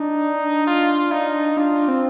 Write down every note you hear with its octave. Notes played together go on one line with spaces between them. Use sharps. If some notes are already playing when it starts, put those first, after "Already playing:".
Already playing: D4 D#4
F4
D#4
D4 F4
C4